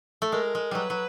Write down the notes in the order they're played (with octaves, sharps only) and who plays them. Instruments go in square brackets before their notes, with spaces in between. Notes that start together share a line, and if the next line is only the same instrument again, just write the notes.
[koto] A3
[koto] G#3 [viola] A#4
[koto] G#3
[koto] F#3 G3 [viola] B4
[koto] F#3